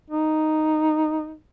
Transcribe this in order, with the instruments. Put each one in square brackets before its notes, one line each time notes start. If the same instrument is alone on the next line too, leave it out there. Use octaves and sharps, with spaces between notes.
[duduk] D#4